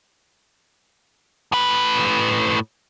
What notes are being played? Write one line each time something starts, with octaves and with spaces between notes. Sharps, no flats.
A2 B4